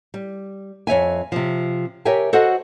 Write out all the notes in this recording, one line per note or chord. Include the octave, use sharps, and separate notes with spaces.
G3
F2 C#5 E5 G#5
C3 F3
G4 A#4 C#5 E5 G5 G#5
F#4 A4 C5 D#5 F#5